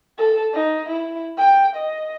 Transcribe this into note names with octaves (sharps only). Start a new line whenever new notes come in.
A4
D#4
E4
G5
D#5